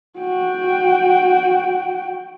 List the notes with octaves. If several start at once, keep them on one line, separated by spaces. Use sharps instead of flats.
F#4 G5